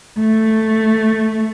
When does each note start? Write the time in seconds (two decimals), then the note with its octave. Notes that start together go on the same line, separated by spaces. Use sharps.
0.19 A3